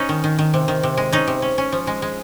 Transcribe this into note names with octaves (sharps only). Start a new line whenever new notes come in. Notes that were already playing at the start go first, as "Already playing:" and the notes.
Already playing: C#4 D#4
D#3
D#3
D#3
C3
D#3
C3
G#3
C#4 D#4
C3
C#4
C#4
F3
G#3
G#3